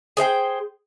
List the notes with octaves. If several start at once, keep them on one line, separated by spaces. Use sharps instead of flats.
G#4 C5 F5 G5